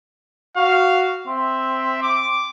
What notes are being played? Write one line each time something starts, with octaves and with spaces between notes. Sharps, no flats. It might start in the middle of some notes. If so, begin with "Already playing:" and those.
F#4 F5
C4 E5
D6